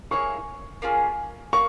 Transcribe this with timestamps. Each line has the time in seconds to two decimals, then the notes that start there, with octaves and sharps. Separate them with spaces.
0.11 A#3 E4 G#4 C#5 C#6
0.82 A#3 C#4 F4 G#4
1.53 A#3 C#6